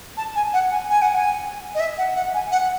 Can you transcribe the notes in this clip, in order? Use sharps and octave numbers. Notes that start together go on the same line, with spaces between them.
A5
G#5
F#5
G#5
G#5
F#5
G#5
D#5
E5
F#5
F#5
G#5
F#5